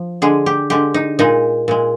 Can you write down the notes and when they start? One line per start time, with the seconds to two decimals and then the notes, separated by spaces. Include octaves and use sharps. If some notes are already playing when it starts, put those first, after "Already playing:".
Already playing: F3
0.22 D3 G#3 G#4
0.46 G4
0.70 D3 G#3 G4
0.94 D#4
1.19 A#2 G#3 D#4
1.68 A#2 G#3